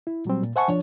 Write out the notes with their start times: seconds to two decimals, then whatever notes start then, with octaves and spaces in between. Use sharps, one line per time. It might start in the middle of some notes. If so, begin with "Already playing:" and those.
0.07 E4
0.25 A#2 F#3 G3 C4
0.43 A#2
0.56 C5 E5 F#5 G#5 A5 C#6
0.68 F3 D4 C#5